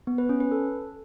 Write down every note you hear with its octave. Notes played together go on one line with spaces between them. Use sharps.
B3
B4
C#4
B4
A4